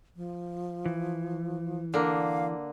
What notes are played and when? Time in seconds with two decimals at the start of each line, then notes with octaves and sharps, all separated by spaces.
0.16 F3
0.86 E3
1.94 D3 A#3 F5